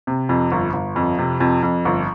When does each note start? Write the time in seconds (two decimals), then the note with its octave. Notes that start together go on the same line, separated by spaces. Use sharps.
0.07 C3
0.29 F2
0.52 G1
0.73 G1
0.96 F2
1.18 C3
1.40 F2
1.63 F2
1.85 G1